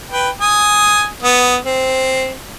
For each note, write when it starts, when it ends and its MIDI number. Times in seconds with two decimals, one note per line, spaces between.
0.10 0.30 71
0.10 0.30 79
0.41 1.07 80
0.41 1.07 87
1.23 1.57 59
1.23 1.57 87
1.65 2.34 60